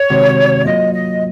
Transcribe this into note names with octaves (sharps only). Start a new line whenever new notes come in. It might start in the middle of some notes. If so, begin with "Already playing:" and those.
Already playing: C#5
C3 D#3 G#3 C4 F#4
F#3 A#3 F4 D#5
D#5